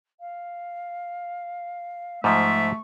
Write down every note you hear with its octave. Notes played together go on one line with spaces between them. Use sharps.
F5
G#2 F3 A3 E5 C#6